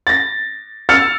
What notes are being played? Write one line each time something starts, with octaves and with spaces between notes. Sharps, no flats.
A6 A#6
E6 F6 A6 C#7